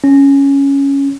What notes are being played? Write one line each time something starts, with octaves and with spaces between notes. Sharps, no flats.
C#4